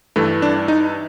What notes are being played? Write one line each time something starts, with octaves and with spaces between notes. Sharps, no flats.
G2 E3 A3
D4
D#4